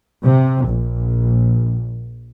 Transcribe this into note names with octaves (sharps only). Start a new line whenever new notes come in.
C3
A#1